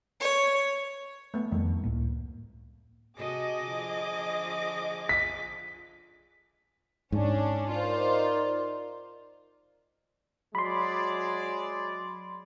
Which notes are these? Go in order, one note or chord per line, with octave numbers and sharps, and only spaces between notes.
C#5
A3 B3
F2 D#3 G3 A3
C#2 A2 A#3
C3 F#4 G#4 A4 D#5 D6
D3 F3
B6
G#2 C#4 D4
D#4 F4 A#4 C5 D5
F#3 G#3 D5 B5 C6